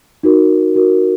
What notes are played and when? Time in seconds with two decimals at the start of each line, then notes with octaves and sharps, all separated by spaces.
0.23 D#4 F#4 A#4
0.75 D#4 F#4 A#4